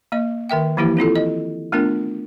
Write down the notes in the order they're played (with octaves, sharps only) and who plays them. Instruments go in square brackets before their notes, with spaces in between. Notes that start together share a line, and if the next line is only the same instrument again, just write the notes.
[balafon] A#3 D#5
D#3 A#4 E5 G5
E3 F3 A#3 E4 G4
C4 E4 F4 A4
D#5
A3 B3 D4 F4 A#4